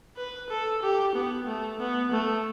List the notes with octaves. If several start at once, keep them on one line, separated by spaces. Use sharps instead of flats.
B4
A4
G4
B3
A3
B3
A3